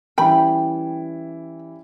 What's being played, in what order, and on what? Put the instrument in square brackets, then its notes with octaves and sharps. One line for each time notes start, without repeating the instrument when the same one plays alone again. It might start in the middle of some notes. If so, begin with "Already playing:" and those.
[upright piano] E3 G3 C#4 E4 [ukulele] G5 B5